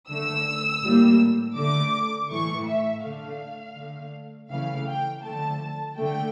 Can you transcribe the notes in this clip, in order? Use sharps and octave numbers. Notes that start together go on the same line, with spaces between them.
D3 A3 E6
A2 G3 A#3
D3 A3 D6
A2 E3 A3 C#6
E5
D3 A3 F5
D3 A3
C#3 E3 A3 F5
G5
D3 F3 A3 A5
D3 A3 G5